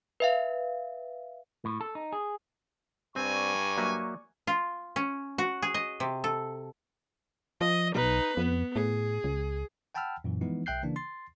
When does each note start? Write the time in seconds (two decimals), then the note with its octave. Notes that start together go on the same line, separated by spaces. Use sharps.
0.20 B4 E5 F5
1.65 A2
1.81 A4
1.95 D#4
2.13 G#4
3.16 G2 C4 D5 G#5 C#6
3.77 F#3 A#3 E5
4.47 F4
4.96 C#4
5.38 F#4
5.62 G#4
5.74 D#5
6.00 C3
6.24 A4
7.61 F3 D#5
7.95 B1 D#4 B4
8.37 F2 B3
8.76 A2 G#4
9.24 C#2
9.95 F#5 G5 A5 B5 E6 F6
10.24 F#2 A#2 E3
10.41 E3 F3 G#3 B3 D#4 E4
10.66 B1 E5 G5 F#6 G6 C7
10.83 C#3 E3 A#3 D4
10.96 C6 A6 C7